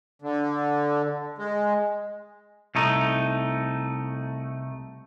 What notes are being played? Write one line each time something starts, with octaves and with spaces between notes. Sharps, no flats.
D3
G#3
C2 A3 D#4